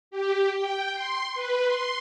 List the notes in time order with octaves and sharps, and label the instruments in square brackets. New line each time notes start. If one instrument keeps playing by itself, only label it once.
[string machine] G4
G5
C6
B4
C6